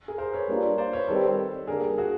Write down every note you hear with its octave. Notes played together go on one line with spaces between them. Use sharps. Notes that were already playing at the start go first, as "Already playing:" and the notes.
G#4 A#4
A#4 C5
B4 C#5
G3 A#3 D4 F4
C5 D5
B4 C#5
D#3 G3 C4 D#4 G4 A4 B4
D3 G3 A#3 G#4 A#4
F#4 G#4